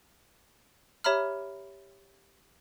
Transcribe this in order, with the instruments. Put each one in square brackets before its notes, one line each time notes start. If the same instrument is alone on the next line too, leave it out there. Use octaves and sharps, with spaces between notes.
[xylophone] G4 C#5 E5 A#5 B5 F6